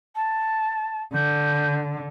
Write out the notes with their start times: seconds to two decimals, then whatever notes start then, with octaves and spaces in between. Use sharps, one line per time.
0.15 A5
1.14 D3 G6